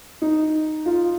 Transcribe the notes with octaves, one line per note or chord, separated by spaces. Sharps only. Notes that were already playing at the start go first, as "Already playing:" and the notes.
D#4
F4